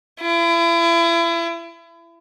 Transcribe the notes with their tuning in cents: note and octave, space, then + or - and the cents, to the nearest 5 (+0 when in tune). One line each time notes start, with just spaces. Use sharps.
E4 +35